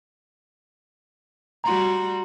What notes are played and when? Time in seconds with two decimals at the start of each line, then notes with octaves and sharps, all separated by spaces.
1.64 G3 F#4 A#5 C6